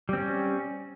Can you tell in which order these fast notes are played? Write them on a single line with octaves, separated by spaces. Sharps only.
G3 C4 C#4